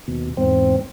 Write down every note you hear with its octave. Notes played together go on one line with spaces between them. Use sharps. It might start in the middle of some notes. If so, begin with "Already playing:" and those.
D#2 B2
E2 G#2 C4